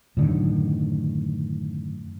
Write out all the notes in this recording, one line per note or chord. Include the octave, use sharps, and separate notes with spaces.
F#2 A2 D3 D#3